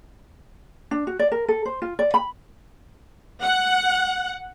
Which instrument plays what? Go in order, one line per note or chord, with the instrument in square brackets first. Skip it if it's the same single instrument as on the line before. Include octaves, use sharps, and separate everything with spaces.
[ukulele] D4
F#4
D5
A#4
A4
C5
F4
D5
B5
[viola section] F#5